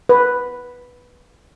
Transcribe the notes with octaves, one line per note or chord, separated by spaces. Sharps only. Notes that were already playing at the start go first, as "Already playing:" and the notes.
B4